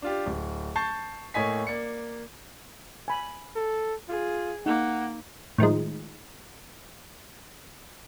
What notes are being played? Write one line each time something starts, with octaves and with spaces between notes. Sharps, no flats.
D4 F4 G4
D1
A5 C#6 G6 A6 C7
A2 A#3 C#5 D#5 G#5 B6
A#3 D5 C#7
G#5 B5
A4
F4 G#4
A#3 D#4 F#5
A2 D#3 F3 G#3